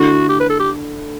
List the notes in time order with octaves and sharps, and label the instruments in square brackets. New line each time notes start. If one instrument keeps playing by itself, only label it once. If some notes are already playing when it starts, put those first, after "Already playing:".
Already playing: [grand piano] D3 A3 E4 [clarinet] F#4
[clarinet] G4
B4
A4
G4